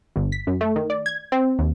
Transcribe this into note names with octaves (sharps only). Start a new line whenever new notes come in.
G1
B6
F#2
A3
D#3
D5
G#6
C4
D#2